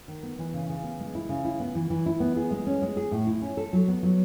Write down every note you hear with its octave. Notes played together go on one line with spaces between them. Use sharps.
D#3
B3
E3
C#3
C#3
B3
G#3
E4
C#3
E4
B3
E3
E3
E4
B3
G#4
G#3
C#4
G#3
G#4
A2
E4
C#4
A4
F#3
B3
F#3